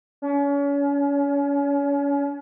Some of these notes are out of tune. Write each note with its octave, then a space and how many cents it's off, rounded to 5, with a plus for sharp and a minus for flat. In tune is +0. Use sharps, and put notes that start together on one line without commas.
C#4 +35